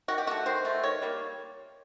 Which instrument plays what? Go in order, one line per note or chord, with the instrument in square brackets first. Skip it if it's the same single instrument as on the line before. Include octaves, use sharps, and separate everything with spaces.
[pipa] D#3 F#4
G4
F#3 A3 F#4
D#3 C5
F#3 A3
D#3 C#5
G3 A#3